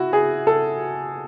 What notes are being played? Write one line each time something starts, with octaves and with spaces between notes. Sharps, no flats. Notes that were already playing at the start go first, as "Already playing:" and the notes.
Already playing: E4 F#4
G#4
A4